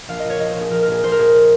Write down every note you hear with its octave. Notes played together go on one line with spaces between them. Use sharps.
A#1 F5
A#2 D#5
C#5
A#2 D#5
C5
A#1 G#4
A#1 A#4
A#4
A#2 G#4
A#1 C5
A#4
A#2 G#4